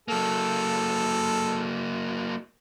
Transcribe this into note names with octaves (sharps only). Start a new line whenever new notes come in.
F#3 A#3 A4